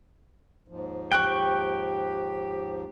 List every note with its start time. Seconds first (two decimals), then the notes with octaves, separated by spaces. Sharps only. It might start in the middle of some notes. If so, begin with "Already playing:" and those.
0.68 D#2 G#2 F3
1.12 G4 G5 C#6 F#6 D7